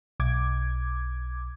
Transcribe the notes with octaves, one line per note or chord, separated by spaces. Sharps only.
B1 D6 G#6